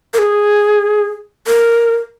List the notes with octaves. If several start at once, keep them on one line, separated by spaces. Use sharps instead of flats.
A#4
G#4
A#4